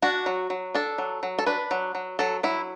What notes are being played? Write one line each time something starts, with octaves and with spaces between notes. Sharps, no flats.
D4 F#4
F#3
F#3
D4 A4
F#3
F#3
A4
D4 B4
F#3
F#3
F#3 A4
F#3 E4